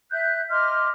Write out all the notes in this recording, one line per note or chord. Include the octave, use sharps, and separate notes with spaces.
E5 F#6 G6
D#5 C6 D6 F6